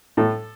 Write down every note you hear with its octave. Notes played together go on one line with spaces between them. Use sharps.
A2 A4